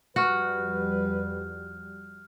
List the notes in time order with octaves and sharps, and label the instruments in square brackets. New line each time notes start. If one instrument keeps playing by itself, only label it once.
[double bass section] F2 G3 [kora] F#4 [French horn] B4 [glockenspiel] F6 F#6